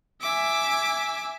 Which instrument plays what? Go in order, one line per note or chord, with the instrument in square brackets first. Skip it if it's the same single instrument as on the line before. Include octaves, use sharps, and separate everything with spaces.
[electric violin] E5 G#5 [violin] D6